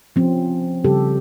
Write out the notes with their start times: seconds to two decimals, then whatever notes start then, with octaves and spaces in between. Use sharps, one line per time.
0.16 F3 C4 C#4
0.84 C#3 G3 G4 A4